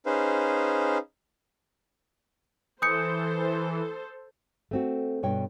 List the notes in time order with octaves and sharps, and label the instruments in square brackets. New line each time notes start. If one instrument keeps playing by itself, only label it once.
[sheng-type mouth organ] C#4 D#4 G#4 B4 C5 F5
[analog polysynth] E3 [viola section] A4 C5 [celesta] D#6 G6 C#7
[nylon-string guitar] A3 C4 F#4
G2 B2 C#5 G5